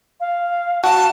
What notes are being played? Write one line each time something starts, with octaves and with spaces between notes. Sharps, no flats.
F5
F#4 A5